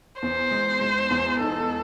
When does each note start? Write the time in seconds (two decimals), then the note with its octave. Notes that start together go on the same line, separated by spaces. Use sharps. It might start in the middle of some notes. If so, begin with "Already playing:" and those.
0.22 E2 C5
0.51 G#3
0.81 G#3
1.10 E2
1.40 D#4 A4